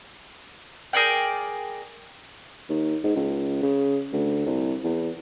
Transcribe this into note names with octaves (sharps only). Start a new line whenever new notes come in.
G#4 A#4 D5 G5
D#2
G#2
C#2
C#3
D2
C2
E2